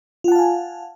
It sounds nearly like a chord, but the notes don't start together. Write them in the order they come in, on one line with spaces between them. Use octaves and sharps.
F4 F#5 A5 F5 G#5